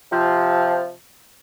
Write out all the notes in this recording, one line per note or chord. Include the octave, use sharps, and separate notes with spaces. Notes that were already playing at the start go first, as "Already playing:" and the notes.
C3 F3